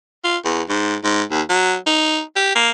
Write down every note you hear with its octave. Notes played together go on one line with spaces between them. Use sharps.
F4
E2
G#2
G#2
D#2
F#3
D#4
G4
A#3